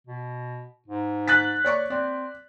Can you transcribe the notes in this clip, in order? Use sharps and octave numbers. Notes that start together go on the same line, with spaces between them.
B2
G#2
F#6 A6 B6
C#5 D5 C#6
C4 D5